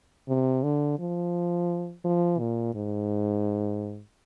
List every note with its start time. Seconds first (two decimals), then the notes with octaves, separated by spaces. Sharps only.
0.29 C3
0.63 D3
0.99 F3
2.05 F3
2.39 A#2
2.74 G#2